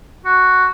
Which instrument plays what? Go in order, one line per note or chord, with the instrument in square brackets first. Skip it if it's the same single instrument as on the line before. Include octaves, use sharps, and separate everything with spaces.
[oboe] F#4